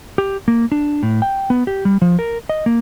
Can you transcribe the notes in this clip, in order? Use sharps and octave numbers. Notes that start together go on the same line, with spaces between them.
G4
A#3
D4
A2
G5
B3
G4
G3
F3
A#4
D#5
A#3